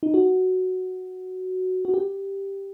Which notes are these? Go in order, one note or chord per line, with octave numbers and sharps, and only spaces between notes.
D#4
F#4
F#4
G4